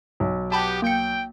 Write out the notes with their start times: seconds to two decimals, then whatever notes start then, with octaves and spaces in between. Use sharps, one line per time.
0.20 B1
0.52 B3 G4 A5 B5
0.82 A#3 G5 C#7